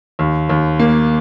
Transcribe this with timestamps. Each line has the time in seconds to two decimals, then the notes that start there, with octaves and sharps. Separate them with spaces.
0.19 D#2
0.49 D#2
0.79 A#3